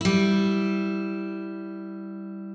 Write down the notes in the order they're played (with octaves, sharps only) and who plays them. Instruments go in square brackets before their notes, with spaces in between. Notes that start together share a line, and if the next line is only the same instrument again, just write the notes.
[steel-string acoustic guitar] G3 E4